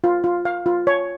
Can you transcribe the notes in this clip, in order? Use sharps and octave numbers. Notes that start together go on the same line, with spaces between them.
F4
F4
F5
F4
C#5